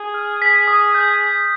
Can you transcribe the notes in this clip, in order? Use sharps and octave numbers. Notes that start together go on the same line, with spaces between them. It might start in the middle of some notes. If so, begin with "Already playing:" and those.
Already playing: G#4
F6
B6
D#6
G6